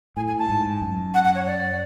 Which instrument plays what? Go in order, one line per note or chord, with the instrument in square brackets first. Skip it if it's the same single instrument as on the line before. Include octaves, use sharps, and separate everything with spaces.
[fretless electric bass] A2 [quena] G#5
[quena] G#5
A5
[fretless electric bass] G#2
F#2
[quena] F#5
F#5
C#5
D5